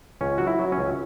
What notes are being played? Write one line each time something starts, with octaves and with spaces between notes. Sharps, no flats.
C#2 C#4
F#3 F#4
E4
F#3
C#4
C#2